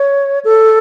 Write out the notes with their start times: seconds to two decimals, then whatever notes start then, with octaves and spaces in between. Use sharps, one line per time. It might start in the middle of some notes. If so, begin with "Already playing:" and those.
Already playing: C#5
0.45 A4